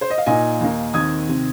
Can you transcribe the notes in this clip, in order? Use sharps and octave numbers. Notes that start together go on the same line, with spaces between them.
C5
D#5
F5
A#2 A#3 D#4 D#5 G#5
D#2 D#3 A#3 D#4
D#2 D#3 C4 D#6 G#6
C3 D#3 C4